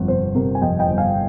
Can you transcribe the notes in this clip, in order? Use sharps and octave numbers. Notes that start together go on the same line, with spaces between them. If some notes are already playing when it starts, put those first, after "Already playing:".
Already playing: G1 F2
C3 C5
C3 A#4
G#5
F2 D#5 G5
D#5 G5
G1
F5 G#5